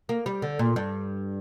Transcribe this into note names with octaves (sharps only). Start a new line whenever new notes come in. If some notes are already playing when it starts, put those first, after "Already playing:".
A#3
G3
D3
A#2
G2